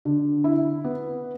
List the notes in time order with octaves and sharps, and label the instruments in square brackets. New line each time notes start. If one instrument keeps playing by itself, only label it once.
[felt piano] D3
E4
B3